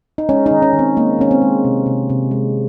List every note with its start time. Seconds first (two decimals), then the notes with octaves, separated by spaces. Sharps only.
0.18 D#4
0.29 G#3 C#4
0.46 D#3 D#4
0.62 C#4
0.73 D#3
0.79 C4
0.96 G#3 A#3
1.18 D#3 C#4
1.31 C4
1.42 G#3
1.65 C3
1.86 C3
2.10 C3
2.31 G#3